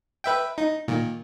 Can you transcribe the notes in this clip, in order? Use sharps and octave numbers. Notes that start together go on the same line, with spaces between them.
B4 E5 G5
D#4
A#2 D#3